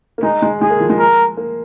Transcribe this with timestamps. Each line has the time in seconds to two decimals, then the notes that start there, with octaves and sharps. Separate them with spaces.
0.18 A#3
0.23 G#3 D#4
0.42 G#3
0.61 G#3 G#4
0.70 A#3
0.80 F3
0.90 G#3
0.99 A#4
1.37 A#3